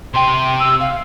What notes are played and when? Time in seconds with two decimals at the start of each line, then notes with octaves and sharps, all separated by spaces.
0.14 C3 G5 C6
0.60 E6
0.80 F5